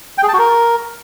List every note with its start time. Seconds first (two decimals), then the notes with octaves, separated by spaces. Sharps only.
0.18 G5
0.23 G#4
0.28 A5
0.34 F#4
0.39 A#4